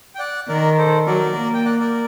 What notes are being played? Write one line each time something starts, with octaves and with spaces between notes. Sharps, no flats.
G5
D5 F#5
D#3 A#4 D5
A4 C5
F#3 A#4 D5
A#3
G5
D5 F#5
A#4 D5